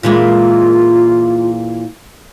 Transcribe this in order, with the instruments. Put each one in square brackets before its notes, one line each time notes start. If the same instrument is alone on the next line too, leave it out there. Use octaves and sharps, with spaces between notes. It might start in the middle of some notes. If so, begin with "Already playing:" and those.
[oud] A#2 E3 G#3 [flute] F4